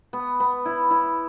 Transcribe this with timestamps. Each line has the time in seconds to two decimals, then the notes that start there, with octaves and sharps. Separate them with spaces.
0.13 B3
0.40 B3
0.66 E4
0.90 E4